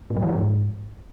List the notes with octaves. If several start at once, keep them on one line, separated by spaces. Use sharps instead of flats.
A2
F#3
E3
F3
G#2